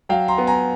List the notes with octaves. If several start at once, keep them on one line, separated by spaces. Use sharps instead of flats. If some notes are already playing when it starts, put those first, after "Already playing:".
F#3 F5 G5
A#5 C6
B3
G#5 A#5